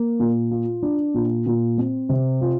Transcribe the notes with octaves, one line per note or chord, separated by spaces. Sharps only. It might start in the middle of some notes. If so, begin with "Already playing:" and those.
Already playing: A#3
A#2
F4
D4
A#2
A#2
C4
C3
F4